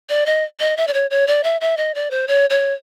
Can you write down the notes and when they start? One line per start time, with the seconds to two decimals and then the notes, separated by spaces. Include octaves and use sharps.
0.09 D5
0.26 D#5
0.60 D#5
0.77 E5
0.87 D5
0.93 C#5
1.10 C#5
1.27 D5
1.44 E5
1.61 E5
1.77 D#5
1.95 D5
2.11 C5
2.27 C#5
2.50 C#5